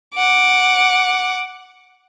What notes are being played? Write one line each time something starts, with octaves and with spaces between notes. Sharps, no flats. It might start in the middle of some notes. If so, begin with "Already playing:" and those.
F#5 D6